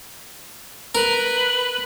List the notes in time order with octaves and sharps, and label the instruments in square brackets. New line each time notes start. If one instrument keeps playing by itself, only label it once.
[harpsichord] A#4 [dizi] B4